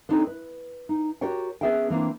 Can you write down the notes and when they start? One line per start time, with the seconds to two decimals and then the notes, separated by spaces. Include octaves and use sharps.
0.09 B3 C4 D4 D#4 A4 C#5
0.27 B4
0.89 D#4
1.21 F#4 G4 A#4 C#5 D5 G5
1.61 B3 C#4 G#4 E5 F5 G5
1.90 E3 A#3 C4 D4